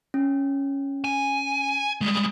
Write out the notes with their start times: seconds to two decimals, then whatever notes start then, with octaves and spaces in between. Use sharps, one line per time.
0.14 C#4
1.04 G#5
2.01 G3 G#3